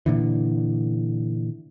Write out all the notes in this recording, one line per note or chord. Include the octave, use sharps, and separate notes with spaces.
A#2 D3 E3